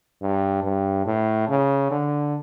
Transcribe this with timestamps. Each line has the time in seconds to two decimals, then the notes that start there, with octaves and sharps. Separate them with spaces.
0.22 G2
0.64 G2
1.06 A2
1.49 C#3
1.91 D3